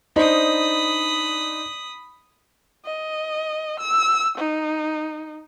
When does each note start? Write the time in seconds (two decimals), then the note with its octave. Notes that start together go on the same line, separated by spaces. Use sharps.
0.16 D4 D#4 C5 B5 D#6
2.85 D#5
3.80 E6
4.38 D#4